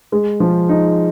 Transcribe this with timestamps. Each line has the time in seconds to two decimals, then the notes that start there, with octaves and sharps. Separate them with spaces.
0.12 G#3
0.40 F3
0.69 D#4